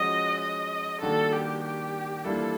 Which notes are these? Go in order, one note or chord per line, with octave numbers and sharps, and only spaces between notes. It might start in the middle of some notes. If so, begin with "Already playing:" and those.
Already playing: F3 G#3 C#4 F#4 D#5
D#5
D#3 G3 A#3 D4 F#4 A4
G4
G4
E3 G3 A#3 D4 F4 A4